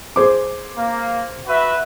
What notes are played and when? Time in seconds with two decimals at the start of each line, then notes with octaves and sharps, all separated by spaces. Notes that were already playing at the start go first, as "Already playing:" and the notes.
0.16 G#4 C5 D6
0.76 A#3
1.45 F#4 B4 E5